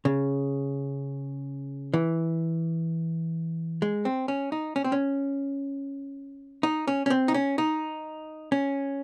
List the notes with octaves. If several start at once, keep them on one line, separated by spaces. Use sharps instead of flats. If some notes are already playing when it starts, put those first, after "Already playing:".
C#3
E3
G#3
C4
C#4
D#4
C#4
C4
C#4
D#4
C#4
C#4
C4
D#4
C#4
D#4
C#4